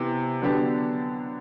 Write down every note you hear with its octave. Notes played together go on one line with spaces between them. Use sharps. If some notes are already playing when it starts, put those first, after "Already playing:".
Already playing: C3 E3 B3 E4
D3 F#3 B3 D4 G4